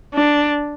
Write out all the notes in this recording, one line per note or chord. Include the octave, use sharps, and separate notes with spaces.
D4